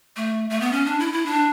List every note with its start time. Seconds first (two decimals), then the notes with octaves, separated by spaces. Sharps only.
0.16 A3
0.50 A3
0.61 B3
0.72 C#4
0.86 D4
1.00 E4
1.13 E4
1.26 D4